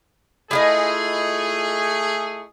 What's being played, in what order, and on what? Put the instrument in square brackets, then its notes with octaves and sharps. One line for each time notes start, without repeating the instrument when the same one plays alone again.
[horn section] A3 G#4 [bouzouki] E4 F4 D#5